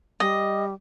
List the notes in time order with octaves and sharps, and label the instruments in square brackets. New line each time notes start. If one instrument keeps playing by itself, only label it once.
[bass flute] G3 [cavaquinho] D#5